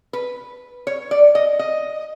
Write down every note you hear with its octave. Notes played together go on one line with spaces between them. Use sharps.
B4
C#5
D5
D#5
D#5